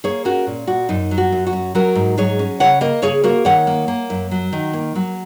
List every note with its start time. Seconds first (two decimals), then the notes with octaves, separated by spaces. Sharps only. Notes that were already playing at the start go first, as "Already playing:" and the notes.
0.04 A#3 G#4 C#5
0.25 C#4 F#4 A#4
0.47 A#2
0.67 A#3 F#4
0.89 F#2 D#4
1.11 F#3
1.18 F#4
1.32 F#2
1.47 F#4
1.53 C#4
1.75 F#3 F#4 A#4
1.95 G#2
2.18 F#3 G#4 C#5
2.39 C#4
2.60 C#3 C#5 F#5
2.81 A#3 A#4 D#5
3.02 C#3 G#4 C#5
3.24 A#3 F#4 A#4
3.45 D#3 C#5 F#5
3.67 A#3
3.88 A#3
4.10 F#2
4.31 F#3
4.53 D#3
4.73 A#3
4.95 F#3